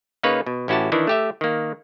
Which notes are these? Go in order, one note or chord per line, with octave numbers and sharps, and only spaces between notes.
C#3 A#3 D#4 B4 C#5
B2
A1 C#4 E4 F#4 G4 A5
D#3 E3 D4 E4
A3 G4 E5
D#3 A#3